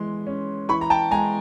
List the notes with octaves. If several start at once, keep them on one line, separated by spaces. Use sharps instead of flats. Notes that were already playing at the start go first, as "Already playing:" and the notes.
Already playing: E3 G#3 C6
C#4
E3 B5 C#6
A#5
G5 A5
G#3 G#5 A#5